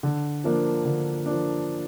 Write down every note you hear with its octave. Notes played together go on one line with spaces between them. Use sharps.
D3
F3 A#3 D4
D3
F3 A#3 D4